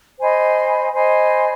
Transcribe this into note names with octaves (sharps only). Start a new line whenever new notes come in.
C5 D#5 G#5 B5
C5 D#5 G#5 B5